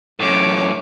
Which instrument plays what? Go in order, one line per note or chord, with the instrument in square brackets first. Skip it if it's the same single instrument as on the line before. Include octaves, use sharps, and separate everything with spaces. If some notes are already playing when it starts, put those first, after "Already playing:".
[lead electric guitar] F#2 A2 [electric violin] C#5 D6